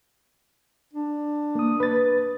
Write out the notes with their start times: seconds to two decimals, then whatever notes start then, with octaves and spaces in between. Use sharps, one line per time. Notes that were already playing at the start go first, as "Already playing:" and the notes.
0.94 D4
1.55 A#3 D#6
1.80 B4 A6